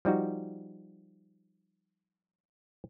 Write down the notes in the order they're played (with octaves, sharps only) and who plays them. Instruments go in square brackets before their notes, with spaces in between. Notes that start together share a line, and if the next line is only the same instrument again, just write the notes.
[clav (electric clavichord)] F3 G3 D#4 F#4